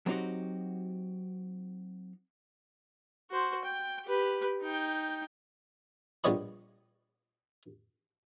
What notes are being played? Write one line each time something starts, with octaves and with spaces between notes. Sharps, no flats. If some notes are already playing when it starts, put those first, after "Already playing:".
F#3 B3 C4 D#4 F#4 G4
F#4 C5
G5
G4 B4
D#4 G5
A#1 G3 B3 C#5 D#5 B5